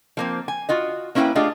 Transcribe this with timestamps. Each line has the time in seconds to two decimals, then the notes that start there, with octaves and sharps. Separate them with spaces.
0.17 F3 A#3 C4
0.48 G#5
0.69 F4 F#4 D#5
1.15 A#3 C#4 E4 G#4 B4 G5
1.35 A3 D4 F4 G4 G#4 D#5